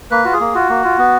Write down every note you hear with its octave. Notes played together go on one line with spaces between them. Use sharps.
A#3 B4
F4 F#4
G#4
A#3
F4 F#4
A#3
F4
B3